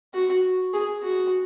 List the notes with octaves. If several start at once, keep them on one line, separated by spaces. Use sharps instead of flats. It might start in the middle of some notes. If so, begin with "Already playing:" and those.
F#4
G#4
F#4